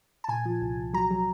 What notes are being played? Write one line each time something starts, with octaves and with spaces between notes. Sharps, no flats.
A5
A#2 G#5
F3
C2
C2
F#3 A#5
F#3